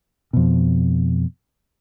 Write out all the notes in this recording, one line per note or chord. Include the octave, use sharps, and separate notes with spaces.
F2 B2